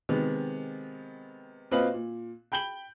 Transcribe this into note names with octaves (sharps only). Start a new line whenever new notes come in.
C3 D#3 G#3 B3
A#2 C4 B4 D#5 F5 F#7
A#2
G5 B5 G6 F#7 G7